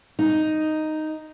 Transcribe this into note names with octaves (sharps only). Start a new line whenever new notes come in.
D#4